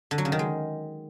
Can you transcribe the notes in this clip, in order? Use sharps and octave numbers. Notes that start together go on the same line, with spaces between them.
D3
F#3
C#3
D#3
G#3